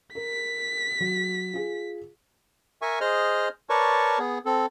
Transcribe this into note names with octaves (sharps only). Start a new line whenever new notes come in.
A#4 B6
F#3
F4 G#4
A#4 E5 G#5 C#6
G#4 C5 D#5 F6
A#4 B4 C#5 D5 A5 C#6
B3 G#4
C4 A4